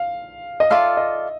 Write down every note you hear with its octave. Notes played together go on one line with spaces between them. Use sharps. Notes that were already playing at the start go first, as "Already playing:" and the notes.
Already playing: F5
D#5
F4 A4 D5 E5 F5
D#5